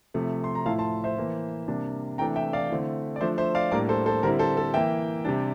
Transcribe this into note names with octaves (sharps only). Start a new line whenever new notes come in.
C3 F3 A3
C6
A#5
A2 F3 A3 E4 F5 A5
A5 C6
C5 E5
E3 A#3 E4
C3 G3 A#3 D4
C3 E3 A3 D4 G5 A#5
E5 G5
D5 F5
D3 A3 C4 E4
D5
F3 A3 D4 C5 E5
C5 E5
D5 F5
A2 G3 A#3 D4 A#4 D5
A4 C5
A4 C5
D3 G3 C4 E4 A#4
A4 C5
A4
E3 A#3 E4 E5 G5
C3 G3 D4